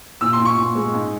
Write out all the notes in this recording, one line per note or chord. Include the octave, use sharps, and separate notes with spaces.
A#2 E6
C6
A#2
C#6
A#2
G#3
G#2